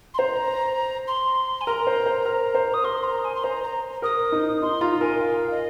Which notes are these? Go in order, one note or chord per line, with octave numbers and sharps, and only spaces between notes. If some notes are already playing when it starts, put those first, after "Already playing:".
C6
C5 A#5
C6
G#5
A#4 A#5
C5
C5
A#4
C5
D#6
A#4 C6
A#5
G#5
C6
C5 A#5
A#5
A#4 D#6
D#4
D#4 C6
F4 A#5
A#4 G#5
F5
D#5